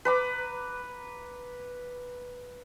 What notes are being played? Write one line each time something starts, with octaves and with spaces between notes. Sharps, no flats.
B4 A#5 D6